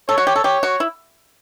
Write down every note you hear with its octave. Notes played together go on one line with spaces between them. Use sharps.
A4 C#5
F#4
G4
A4
G4 C#5
F#4
E4